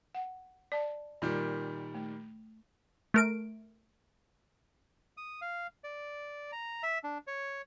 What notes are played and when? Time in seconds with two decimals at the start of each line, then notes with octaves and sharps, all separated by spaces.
0.15 F#5
0.72 D5 A5
1.22 A#2 D#3 G3
1.94 A3
3.14 A3 A#4 D7
5.17 D#6
5.42 F5
5.84 D5
6.52 A#5
6.83 E5
7.04 D4
7.27 C#5